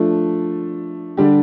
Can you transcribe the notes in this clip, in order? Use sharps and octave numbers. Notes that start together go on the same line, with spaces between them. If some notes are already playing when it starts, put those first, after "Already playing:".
Already playing: F3 A3 D4
D3 G3 D4 G4